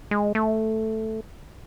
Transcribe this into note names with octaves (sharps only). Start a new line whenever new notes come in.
G#3
A3